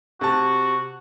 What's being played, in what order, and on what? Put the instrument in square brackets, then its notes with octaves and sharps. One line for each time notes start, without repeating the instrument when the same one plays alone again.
[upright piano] C3 A5 [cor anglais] F#4